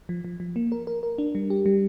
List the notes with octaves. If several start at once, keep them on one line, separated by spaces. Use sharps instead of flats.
F3
F3
F3
A#3
A#4
A#4
A#4
D4
G3
G4
G3